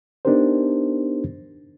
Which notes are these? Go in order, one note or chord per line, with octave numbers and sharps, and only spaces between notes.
B3 D4 D#4 G4 A#4 C5